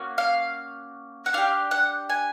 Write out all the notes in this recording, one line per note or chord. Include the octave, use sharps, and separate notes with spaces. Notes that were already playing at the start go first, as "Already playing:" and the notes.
Already playing: A#3 C#4 F#4
F5
F#5
D4 G4 F5
F#5
G#5